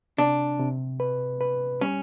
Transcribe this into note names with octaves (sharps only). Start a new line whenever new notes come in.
C3 D4
C3
B4
B4
G3 C#4